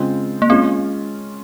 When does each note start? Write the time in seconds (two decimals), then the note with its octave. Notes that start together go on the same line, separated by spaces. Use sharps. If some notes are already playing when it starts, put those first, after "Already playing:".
Already playing: C#3 G#3 C4 F4
0.42 A#3
0.50 G#3 C4 C#4 F4